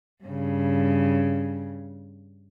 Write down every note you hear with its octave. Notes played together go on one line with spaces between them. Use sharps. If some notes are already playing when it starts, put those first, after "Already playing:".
G2 C#3